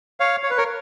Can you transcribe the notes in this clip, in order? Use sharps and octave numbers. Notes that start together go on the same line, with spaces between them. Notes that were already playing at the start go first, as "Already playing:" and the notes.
C#5 F5
C#5
B4
A#4 C#5